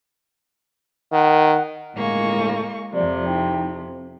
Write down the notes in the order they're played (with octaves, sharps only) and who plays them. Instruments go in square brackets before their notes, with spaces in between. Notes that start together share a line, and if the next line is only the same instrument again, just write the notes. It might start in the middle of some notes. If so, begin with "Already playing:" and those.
[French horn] D#3 [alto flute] F#5
[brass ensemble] G1 C#2 A2 [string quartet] G#3 A#3 C#6
[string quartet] F2 C3 [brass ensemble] F3 F4 D5
[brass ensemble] D#4 E4 G5
C4